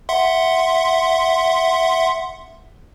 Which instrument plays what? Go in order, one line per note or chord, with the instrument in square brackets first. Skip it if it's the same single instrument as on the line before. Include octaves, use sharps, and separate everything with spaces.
[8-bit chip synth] E5 F#5 C6